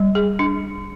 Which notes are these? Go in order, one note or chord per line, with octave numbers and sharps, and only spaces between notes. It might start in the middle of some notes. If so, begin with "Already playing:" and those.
Already playing: G3
G#4
D4